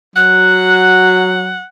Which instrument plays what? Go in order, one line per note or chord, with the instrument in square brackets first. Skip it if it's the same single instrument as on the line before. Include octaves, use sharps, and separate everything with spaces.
[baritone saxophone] F#3 [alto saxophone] F#5 [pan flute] F#6